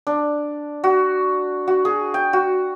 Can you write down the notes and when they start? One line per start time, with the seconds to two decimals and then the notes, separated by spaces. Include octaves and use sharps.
0.07 D4
0.84 F#4
1.68 F#4
1.85 G#4
2.14 G5
2.33 F#4